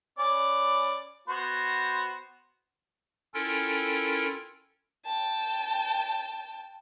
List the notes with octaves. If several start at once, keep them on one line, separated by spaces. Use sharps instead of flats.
C#4 B4 D5
B3 F#4 C5
C#4 E4 F4 A4 A#4 G5
G5 A5